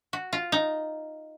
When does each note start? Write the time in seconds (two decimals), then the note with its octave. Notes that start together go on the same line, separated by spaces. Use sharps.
0.13 F#4
0.33 F4
0.52 D#4